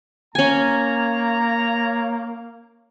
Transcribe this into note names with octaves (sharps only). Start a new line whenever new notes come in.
A#3 C#4 C#5 G#5 A#5